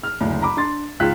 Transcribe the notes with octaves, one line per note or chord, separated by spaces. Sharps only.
F6
F#1 D2
A#5 B5 D6
D4 C6 A6
C#2 G#2 F4 G5 F#6 B6